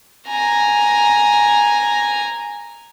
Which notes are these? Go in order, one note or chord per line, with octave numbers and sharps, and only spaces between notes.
G#5 A#5